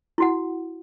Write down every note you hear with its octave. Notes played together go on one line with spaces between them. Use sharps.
E4 F#4 F#5